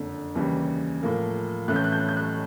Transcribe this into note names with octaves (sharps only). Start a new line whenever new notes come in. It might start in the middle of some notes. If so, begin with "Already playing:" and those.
Already playing: F#1 F2 D3
D#2 C#3 E3 G3
A2 F3 A#3
A2 E3 A3 C#4 F#6
G6
F#6
G6
F#6
G6
F#6